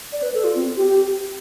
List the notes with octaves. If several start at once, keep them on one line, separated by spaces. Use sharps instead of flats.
D5
B4
A4
F4
C4
G4
G4